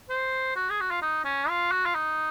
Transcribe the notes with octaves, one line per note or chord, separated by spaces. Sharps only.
C5
F#4
G#4
F#4
F4
D#4
C#4
F4
F#4
F4
D#4